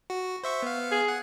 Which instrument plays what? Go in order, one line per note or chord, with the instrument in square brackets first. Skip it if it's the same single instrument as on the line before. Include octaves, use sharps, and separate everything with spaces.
[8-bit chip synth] F#4
C5 E5 C#6
B3 F5
[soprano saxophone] G#4
[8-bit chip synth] F#5